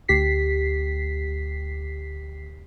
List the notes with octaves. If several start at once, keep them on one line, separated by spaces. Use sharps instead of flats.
D2 G4 B6 C7